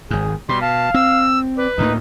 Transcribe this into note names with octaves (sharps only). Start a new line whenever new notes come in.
G#1 G#2 G#4
B2 G3 C6
F5 A5
C4 E6
B4 D5
D2 A2 A#3 D#4